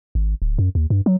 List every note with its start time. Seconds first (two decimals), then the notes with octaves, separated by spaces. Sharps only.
0.15 G#1
0.42 D1
0.59 F#2
0.75 D#2
0.90 G2
1.06 F#3